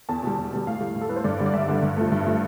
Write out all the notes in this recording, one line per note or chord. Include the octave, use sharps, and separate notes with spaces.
E2 A5
B2 G3
E2
B2 G3
A2 F5
G3
A2
A4
G3 B4
C5
G2 D5
D3 G3
D5
G2 E5
D3 G3
G2
F3 A3
G2
F3 A3